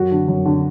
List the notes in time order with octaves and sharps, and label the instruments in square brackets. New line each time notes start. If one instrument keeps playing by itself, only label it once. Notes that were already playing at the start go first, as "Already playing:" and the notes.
Already playing: [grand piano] F#2 F#4
D3
F#2
D3